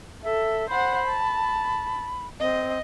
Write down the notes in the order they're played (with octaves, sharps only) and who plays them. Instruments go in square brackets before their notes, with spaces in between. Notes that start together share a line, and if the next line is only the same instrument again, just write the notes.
[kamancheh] A4 [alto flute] E5
[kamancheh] C5 F#5 [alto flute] B5
[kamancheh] A5
[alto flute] C4 [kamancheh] D#5